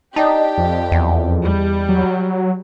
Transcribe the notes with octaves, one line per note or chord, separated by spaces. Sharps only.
D#4 G4 D5 D#5 A5
F2
E2
G3
F#3